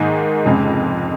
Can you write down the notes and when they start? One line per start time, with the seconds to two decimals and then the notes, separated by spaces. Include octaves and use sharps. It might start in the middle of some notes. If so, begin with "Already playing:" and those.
Already playing: G#2 D#3 A#3 D#4 G#4
0.45 F1 F2 C#3 G#3